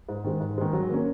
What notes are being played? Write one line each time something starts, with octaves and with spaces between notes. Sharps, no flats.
G#2
D#3 G#3
G#2
D#3 G#3
F#3
A#3 C#4